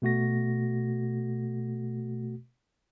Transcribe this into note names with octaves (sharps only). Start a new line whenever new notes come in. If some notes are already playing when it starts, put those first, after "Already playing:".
B2 A3 F#4 A#6